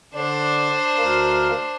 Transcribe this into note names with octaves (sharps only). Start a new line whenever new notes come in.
D3 D4 C5 D5
D2 A#4 F5